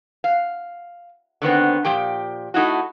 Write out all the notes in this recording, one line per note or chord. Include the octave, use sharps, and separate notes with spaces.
F5
D3 D#3 B3 C4
A#2 F3 G4 G5
A3 D#4 E4 F#4